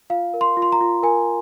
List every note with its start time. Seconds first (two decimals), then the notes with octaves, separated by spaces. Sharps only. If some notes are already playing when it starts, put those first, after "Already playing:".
0.10 F4 F5
0.34 A#4
0.41 C6
0.57 F4
0.62 C6
0.72 A#5
0.81 F4
1.03 A#4 G#5